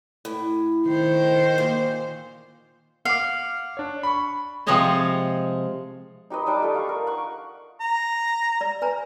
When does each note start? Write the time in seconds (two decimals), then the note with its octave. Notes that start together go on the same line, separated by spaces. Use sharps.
0.25 A2
0.87 D#3 C5
1.58 A#2
3.05 F5 F#5 D6
3.77 D4 C#5
4.03 B5 C#6
4.67 C3 F3 G#3 C#5 D#5 A5
6.30 D#4 G4 B4 D#5
6.46 G3 D4 D#4 D6
6.62 A3 F4 A4
6.74 F5 C#6
6.89 A#4
7.07 F#5 C#6
7.80 A#5
8.61 D5
8.82 B4 G#5 A#5